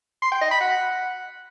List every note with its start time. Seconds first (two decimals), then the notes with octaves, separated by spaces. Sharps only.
0.22 C6
0.32 G5
0.41 D#5
0.51 B5
0.61 F#5